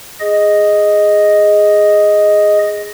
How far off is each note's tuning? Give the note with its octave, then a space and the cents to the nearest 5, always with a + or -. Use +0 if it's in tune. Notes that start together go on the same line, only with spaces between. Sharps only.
G#4 +0 D#5 +0